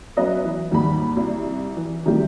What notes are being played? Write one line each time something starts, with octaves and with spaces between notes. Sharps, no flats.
F#3 B3 C#4 B4 D#5 E5
E3
G#1 D#2 D#3 G3 B5
C2
E3
C3 D#3 G3 A3 E4 G4